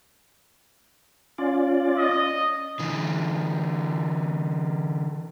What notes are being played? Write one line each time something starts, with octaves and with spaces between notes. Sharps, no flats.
C#4 F4 D5
D#5
D3 E3